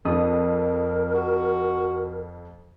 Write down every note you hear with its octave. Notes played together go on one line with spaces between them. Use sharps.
F2 A#4 D#6
F#4